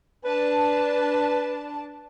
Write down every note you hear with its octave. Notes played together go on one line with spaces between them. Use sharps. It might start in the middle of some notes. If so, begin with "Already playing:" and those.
D4 B4 A5